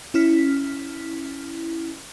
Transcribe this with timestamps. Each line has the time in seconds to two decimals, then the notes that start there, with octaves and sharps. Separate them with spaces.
0.14 C#4 E4 F6 B6